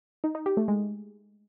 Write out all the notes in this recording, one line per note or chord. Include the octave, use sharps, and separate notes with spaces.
D#4
D#4
G4
A3
G#3